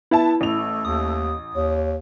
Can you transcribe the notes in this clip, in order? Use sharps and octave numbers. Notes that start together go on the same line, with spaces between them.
B3 E4 E5 A5
A1 A3 F7
D#2 D#6
D#2 C#5